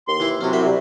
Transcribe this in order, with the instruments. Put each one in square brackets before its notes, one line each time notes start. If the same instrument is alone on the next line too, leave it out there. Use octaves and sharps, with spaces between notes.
[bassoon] D#2 [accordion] C6
[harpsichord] E3 E4
[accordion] C3 F#3 [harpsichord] C#4 F#4
[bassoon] C2 [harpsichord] C5 E5 B5
[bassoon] G3